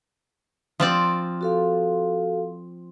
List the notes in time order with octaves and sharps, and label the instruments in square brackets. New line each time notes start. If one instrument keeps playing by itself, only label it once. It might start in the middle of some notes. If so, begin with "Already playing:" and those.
[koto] F3 C4 D5
[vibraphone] F#4 A4 F5